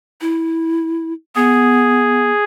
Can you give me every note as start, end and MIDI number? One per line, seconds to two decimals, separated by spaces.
0.21 1.13 64
1.35 2.30 59
1.35 2.44 68